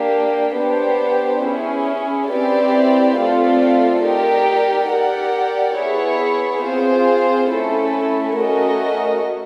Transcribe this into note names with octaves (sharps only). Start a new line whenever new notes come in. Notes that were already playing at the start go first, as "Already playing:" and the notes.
Already playing: A#3 D4 G4
B3 D4 G4 C5
C#4 E4 G#4
C4 E4 G4 B4 D5
A3 C4 F4 A4 D5
D#4 G4 A#4 D5
G4 A#4 D5 F#5
B3 E4 G#4 C#5
C4 F4 G#4 C5
A3 C#4 E4 A4
A3 C#4 F#4 A#4 D#5